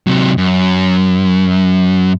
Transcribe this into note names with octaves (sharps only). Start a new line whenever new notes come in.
C3 F#3
F#2